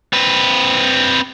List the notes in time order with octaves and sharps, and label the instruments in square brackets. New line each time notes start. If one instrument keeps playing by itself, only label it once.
[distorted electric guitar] C4 B4